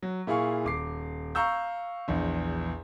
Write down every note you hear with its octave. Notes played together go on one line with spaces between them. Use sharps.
F#3
A#2 E4 G#4 F5 C#6
D#1 D6 C7
F5 A#5 C#6 E6 G6
A#1 E2